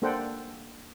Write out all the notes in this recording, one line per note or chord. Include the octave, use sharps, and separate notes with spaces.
A#3 D4 A4 C5 F#5 G5